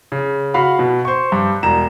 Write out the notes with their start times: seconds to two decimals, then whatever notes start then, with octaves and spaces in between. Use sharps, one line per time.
0.12 C#3
0.54 F#4 F5 B5
0.79 B2
1.05 C5 C#6
1.32 G2
1.63 E1 A#5 E7